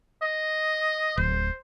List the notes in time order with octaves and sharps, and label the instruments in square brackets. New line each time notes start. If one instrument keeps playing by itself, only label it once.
[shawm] D#5
[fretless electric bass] D1 [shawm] C5